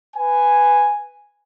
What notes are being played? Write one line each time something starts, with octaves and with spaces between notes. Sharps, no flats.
B4 G#5